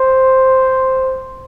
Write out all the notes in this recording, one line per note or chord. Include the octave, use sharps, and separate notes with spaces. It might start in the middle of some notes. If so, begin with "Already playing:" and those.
Already playing: C5